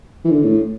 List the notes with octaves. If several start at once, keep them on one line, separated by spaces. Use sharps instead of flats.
E3
D3
A2